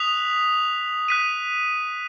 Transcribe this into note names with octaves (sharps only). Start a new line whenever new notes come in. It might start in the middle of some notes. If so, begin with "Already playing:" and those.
Already playing: D#6 F#6 B6 F7
F#6 B6 D#7